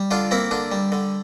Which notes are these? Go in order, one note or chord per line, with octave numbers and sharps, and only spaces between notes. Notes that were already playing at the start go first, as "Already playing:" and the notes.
Already playing: G3
D3 D4 F4
A#3 C4 E4
D3 D4
G3
D3